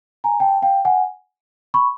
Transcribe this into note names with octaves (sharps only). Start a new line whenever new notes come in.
G#5 A#5
G5 A5
F5 G5
F#5 G#5
B5 C#6